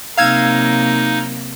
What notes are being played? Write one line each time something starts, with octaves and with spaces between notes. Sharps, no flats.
C3 F#3 A#3 D#4 F5 E6 G#6